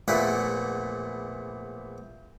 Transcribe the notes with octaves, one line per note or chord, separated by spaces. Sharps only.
A#1 E2 A#2 A3 B4 F#5